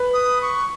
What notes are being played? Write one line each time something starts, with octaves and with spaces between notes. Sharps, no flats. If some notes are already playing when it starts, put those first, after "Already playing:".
Already playing: B4
D#6
C#6